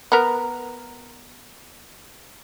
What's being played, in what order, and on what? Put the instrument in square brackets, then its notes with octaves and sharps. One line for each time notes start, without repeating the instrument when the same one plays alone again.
[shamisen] B3 A#4